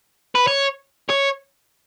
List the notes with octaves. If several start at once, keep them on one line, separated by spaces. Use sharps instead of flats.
B4
C#5
C#5